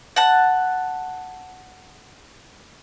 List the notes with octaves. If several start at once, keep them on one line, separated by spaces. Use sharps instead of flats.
F#5 A5